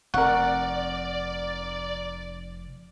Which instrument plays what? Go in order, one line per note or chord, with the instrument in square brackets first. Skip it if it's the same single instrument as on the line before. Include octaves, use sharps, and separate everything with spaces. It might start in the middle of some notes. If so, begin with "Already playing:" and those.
[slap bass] F1 C4 [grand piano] A#4 C#6 [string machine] D5 [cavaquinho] F#5